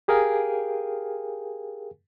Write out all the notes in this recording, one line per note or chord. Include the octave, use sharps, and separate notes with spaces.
G4 G#4 A#4 F5 G5 G#5